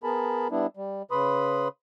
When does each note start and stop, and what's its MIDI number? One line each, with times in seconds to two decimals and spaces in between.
0.04 0.48 59
0.04 0.48 68
0.04 0.48 70
0.04 0.48 81
0.04 0.48 83
0.51 0.67 55
0.51 0.67 59
0.51 0.67 62
0.51 0.67 64
0.77 1.02 55
1.11 1.68 49
1.11 1.68 71
1.11 1.68 83
1.11 1.68 84
1.11 1.68 87